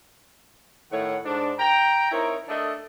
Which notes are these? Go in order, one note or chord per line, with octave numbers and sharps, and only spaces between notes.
A2 D#3 A3 C#5 F#5
G#2 D4
G5 A#5
C4 D#4 E4 A#4 C#5
A3 D4 A4 D#5